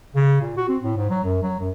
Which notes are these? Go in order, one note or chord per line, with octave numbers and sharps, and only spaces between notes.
C#3
A#2
F#4
C4
A2
G#2
F#3
F#2
F#3
F#2